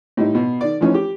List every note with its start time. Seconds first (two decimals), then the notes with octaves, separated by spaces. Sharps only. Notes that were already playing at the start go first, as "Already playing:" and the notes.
0.17 A2 G3 D#4
0.35 B2
0.61 D#3 D5
0.80 E3 F3 A3 C#4 D#4
0.94 G4